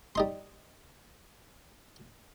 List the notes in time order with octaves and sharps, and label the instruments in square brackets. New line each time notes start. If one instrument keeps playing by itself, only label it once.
[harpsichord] G3 D#4 C6